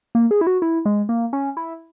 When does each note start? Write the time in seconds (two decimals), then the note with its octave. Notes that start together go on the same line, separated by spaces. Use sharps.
0.15 A#3
0.31 G#4
0.41 E4
0.47 F#4
0.62 E4
0.86 G#3
1.09 A#3
1.33 C#4
1.57 E4